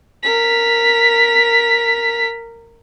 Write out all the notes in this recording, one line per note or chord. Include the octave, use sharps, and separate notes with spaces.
A#4 B6